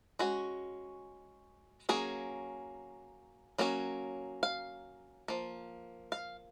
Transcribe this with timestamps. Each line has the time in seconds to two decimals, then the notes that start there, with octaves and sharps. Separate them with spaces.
0.19 G#3 C#4 F#4
1.89 F#3 A#3 C#4 G#4
3.58 F#3 A#3 C#4
4.43 F5
5.28 F3 A#3
6.12 F5